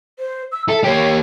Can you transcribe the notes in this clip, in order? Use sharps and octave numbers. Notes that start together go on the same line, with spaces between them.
C5
E6
A4 E5
A#3 G4 C#5